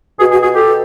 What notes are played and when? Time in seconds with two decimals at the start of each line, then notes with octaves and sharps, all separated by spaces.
0.19 B2 F#4 G#4
0.31 F#4 G#4
0.43 F#4 G#4
0.55 G4 A4
0.67 B2